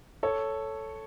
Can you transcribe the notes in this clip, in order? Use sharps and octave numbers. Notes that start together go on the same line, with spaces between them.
A4 C#5